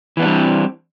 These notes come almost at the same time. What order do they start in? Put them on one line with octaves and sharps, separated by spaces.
E3 B3 D4 G3 C4